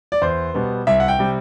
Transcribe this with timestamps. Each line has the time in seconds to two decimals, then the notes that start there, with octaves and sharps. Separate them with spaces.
0.12 D5
0.22 E2 C5
0.54 B2 G3 B3
0.87 C2 E5
1.00 F#5
1.08 G5
1.19 C3 G3